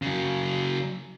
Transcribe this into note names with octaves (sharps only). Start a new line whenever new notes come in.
C#3 F#3